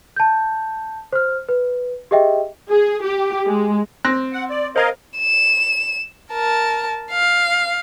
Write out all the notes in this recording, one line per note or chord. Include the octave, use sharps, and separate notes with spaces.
A5 G6
C5 F6
B4
G4 G#4 D#5 E5 G5
G#4
G4
G#3
C4 F#6 A#6
F#5
D5
A#4 C5 D#5 F5 A#5 G#6
E7
A#4 A5
F5